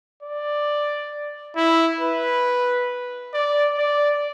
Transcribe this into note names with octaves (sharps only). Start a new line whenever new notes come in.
D5
E4
B4
D5
D5